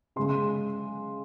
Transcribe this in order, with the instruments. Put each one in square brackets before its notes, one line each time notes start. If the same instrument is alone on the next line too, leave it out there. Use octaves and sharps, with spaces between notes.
[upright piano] C#3 G#3 C6